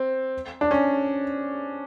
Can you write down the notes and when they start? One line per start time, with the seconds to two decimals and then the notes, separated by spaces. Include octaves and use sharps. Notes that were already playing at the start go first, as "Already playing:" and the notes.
Already playing: C4
0.61 D4
0.71 C#4